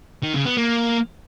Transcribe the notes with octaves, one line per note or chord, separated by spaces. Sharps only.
D#3
C#3
B3
A#3